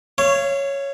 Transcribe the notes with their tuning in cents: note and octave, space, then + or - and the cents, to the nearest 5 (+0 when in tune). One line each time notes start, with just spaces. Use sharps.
C#5 +0 F5 -35